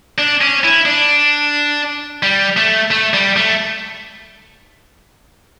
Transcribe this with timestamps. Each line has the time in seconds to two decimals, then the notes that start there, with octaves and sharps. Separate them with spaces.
0.18 D4
0.41 C#4
0.64 E4
0.85 D4
2.23 G3
2.57 A3
2.91 A3
3.13 G3
3.37 A3